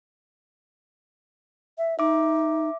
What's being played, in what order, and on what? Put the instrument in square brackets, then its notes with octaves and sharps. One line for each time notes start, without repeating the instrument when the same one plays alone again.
[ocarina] E5
[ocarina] D#4 [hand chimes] E5 D6